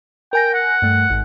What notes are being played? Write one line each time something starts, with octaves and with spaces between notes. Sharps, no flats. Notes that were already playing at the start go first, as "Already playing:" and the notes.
A#4 G5 G#5 A#6
F#5
G2 A3
G#1 G#2